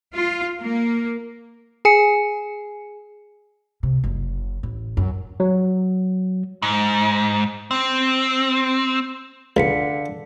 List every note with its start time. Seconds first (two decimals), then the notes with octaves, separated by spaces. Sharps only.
0.14 F4
0.60 A#3
1.85 G#4 G#5 C#7
3.83 C3
4.04 F#1
4.63 A1
4.97 F#2
5.40 F#3
6.62 G#2
7.71 C4
9.57 C#2 D3 F5 B6 C#7